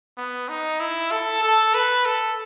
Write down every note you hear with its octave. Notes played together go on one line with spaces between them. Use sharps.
B3
D#4
E4
A4
A4
B4
A4